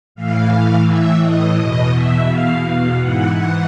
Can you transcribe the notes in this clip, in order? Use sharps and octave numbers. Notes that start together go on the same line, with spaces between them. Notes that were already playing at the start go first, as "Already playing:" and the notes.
A2 E3 F5
E5
D#5
E2 B2 D#5
E5
F5
F5
G#2 E3 F#5
F#5